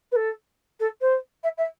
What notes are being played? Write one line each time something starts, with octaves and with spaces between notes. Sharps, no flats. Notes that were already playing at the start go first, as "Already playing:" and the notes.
B4
A4
A4
C5
E5
E5